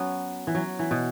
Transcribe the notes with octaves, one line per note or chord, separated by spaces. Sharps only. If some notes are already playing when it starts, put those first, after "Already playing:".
Already playing: F#3 B3 C#4
E3
F#3
E3
B2